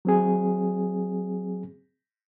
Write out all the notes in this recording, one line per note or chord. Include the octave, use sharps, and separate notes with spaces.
F#3 C4 G#4